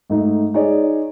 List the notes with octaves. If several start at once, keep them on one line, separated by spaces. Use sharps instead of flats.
G#2 A3 D#4
D#4 G#4 C#5 D5